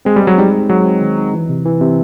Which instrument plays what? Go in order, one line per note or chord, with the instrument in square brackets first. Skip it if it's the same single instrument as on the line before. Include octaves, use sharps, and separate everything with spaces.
[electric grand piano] G#3 [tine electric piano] C4
[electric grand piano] G3
[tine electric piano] G#3
[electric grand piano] F#3
[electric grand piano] G3 [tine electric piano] D#4
[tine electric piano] G#3
[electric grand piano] F#3 [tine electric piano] G#3
[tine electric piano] C4
D#3
D#4
E3
C3
E3
C3